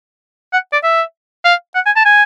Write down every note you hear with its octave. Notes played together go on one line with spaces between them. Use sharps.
F#5
D5
E5
F5
F#5
G#5
A5
G#5